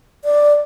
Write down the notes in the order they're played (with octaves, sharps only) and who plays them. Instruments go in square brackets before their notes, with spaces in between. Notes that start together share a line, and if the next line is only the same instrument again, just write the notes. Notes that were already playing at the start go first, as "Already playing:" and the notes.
[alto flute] D5